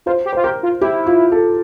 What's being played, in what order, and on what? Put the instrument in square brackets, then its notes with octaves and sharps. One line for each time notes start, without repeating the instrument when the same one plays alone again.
[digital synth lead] F4 [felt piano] C5
[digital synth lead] G4
[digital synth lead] F4 [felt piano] C5
[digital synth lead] G4 [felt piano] A#4
[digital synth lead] F4
[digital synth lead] E4 [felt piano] G4
[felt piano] F4
A4